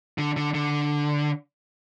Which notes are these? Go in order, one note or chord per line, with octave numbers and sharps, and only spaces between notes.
D3
D3
D3